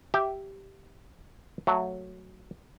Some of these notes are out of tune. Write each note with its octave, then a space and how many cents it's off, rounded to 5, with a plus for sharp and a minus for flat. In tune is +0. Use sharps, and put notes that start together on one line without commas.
G4 -5 E5 +0
F#3 -5 A3 +15